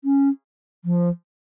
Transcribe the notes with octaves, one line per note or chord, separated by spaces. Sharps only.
C#4
F3